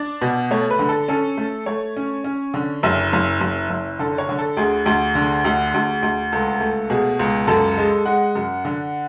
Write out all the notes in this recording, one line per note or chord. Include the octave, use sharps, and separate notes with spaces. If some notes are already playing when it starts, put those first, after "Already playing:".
Already playing: D4 D5
B2
A3 C#5
B4
D3
A4
C#4 A4
A3
A3 C#5
C#4
C#4
D3
F#1 E5
F#1
F#1
F#1
D3 A4
C#5
D3
A4
D2 G#4
D2
D3
D2
D2
D2
C#2 A4
A3
B2 G#4
C#2
F#2 A4
G#3
G#3 F#5
F#2
D3